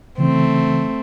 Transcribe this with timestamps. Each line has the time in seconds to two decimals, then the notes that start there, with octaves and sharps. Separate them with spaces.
0.18 C#3 E3 A3 C4